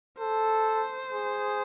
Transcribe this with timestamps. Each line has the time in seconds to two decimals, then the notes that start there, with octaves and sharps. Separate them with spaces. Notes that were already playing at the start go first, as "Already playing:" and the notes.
0.19 A4 C5
1.12 G#4